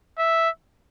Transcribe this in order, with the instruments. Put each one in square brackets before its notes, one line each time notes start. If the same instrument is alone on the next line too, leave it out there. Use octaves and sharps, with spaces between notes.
[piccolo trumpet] E5